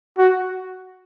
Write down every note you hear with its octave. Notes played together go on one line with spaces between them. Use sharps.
F#4